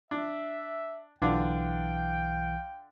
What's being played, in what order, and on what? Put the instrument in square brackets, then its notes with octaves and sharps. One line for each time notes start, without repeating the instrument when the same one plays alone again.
[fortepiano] D4 [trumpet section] E5
[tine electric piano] B1 E3 [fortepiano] D3 D4 F4 [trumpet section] F5 G5